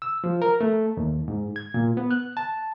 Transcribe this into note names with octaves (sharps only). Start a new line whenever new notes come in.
E6
F3
A#4
A3
D#2
G#2
G#6
A#2
B3
F#6
A5